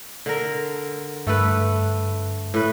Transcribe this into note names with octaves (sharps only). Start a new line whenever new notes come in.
D3 A#4
G2 A3 A4 B4
A2 B4